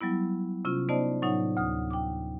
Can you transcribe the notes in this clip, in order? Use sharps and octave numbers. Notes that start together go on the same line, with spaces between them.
F#3 G3 B3 E4
C3 C#4 F4
B3 D#4 C5 D5 D#5 A5
A2 F#3 D#4 C#5 F#5
D2 D#6
G5 D6